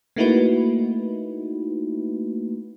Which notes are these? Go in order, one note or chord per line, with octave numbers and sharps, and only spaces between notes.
A3 A#3 D#4 E4 F#4 B4